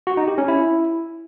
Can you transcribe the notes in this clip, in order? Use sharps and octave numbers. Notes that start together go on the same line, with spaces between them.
F#4
D#4
G4
C#4
E4